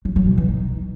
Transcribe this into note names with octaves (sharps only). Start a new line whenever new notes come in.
F#3
F#3
B2
E3
D#4